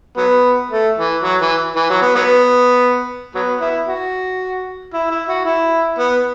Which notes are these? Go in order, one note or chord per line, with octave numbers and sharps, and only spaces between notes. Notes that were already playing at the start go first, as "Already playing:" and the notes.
F#3 B3
A3
E3
F#3
E3
E3
F#3
B3
F#3 B3
F#3 B3
B3 E4
F#4
E4
E4
F#4
E4
B3